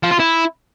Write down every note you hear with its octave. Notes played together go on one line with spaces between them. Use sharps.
F3
F4
E4